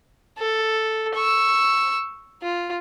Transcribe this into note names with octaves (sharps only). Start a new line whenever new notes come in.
A4
C#6 E6
F4